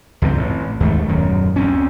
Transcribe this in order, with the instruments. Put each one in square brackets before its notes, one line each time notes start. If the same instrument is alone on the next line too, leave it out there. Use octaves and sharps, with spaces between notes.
[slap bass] C#2 G2 D3 C4
A1
D#2 G#2 A3
D#1 F#2 D#3
D2 C4 C#4